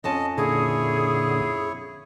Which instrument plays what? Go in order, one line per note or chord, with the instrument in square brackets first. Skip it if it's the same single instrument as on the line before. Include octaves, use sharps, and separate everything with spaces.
[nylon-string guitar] F2 C#4 A5 [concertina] D#5
[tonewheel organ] A#2 D3 [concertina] E4 C#5 [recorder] G#4